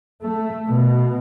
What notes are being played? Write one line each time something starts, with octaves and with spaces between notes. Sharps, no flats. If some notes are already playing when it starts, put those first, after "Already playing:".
A3
B2